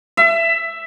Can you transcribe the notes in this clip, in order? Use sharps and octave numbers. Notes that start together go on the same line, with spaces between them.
E5